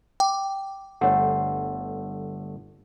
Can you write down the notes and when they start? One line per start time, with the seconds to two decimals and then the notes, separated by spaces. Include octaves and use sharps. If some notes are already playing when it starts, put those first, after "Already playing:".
0.20 G5 D6
1.01 G1 A3 C5 C#5 F#5